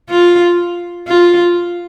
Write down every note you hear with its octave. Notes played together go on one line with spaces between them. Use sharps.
F4
F4